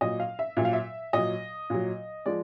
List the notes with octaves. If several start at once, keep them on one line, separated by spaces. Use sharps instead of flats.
A#2 F#3 D#5
F5
E5
A#2 F#3 E5 F5
E5
A#2 F#3 D#5
A#2 F#3
F3 G#3 D5